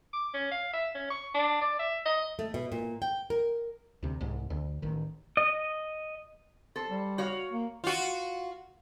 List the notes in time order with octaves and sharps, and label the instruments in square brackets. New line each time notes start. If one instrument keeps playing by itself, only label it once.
[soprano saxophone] D6
C#4
F5
E5
C#4
C#6
D4
D5
E5
D#5
[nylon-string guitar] A3
B2
A#2
G5
A#4
[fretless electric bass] D2 C3
C2 G#2
D2
A1 D#3
[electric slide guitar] D#5
[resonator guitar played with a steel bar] A4 C5
[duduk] G3
[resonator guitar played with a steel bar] F#4 C#5 F5
[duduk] A#3
[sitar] F4 F#4